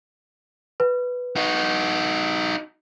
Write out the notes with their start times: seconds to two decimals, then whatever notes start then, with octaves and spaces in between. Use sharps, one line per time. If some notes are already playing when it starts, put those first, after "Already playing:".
0.80 B4
1.36 D#4 F#4